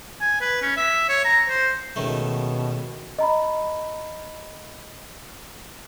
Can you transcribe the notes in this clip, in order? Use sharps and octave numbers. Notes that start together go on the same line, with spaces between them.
G#5
B4
C#4
E5
C#5
A#5
C5
C#2 B2 D#3 A3
D#5 A#5 B5